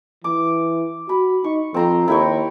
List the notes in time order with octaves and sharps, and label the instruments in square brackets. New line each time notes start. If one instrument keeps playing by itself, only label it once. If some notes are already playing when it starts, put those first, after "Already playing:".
[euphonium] E3 [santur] D6
[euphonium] F#4 [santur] B5
[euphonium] D#4 [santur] C#6
[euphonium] F2 [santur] C4 A#5 C6
[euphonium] D#2 [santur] E4 G5 C#6